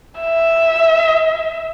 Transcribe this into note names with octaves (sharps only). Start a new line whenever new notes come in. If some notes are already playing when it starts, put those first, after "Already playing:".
E5